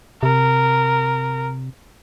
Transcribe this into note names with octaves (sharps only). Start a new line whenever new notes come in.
C3 A#4